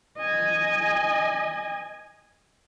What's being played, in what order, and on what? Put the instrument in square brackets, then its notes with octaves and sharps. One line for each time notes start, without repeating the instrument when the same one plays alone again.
[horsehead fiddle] D#5 G#5